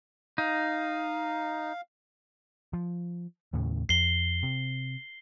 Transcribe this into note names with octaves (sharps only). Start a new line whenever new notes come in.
D#4 F5
F3
D#2 A2 C#3
F2 C7 G7
C3